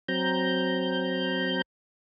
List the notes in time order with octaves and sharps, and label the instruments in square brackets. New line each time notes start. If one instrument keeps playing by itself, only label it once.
[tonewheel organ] F#3 C4 A#5 G6